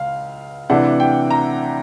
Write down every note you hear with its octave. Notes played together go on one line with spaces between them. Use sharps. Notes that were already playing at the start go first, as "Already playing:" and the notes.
Already playing: C#2 F5
C3 E3 A3 D4 F#5
G5
A#5